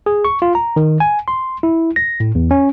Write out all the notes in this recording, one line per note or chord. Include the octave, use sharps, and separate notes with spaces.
G#4
C#6
F4
A#5
D#3
G#5
C6
E4
A#6
A2
E2
C#4